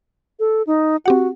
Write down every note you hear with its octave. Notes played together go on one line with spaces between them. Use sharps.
A4
D#4
C4 F#4 G4 F#5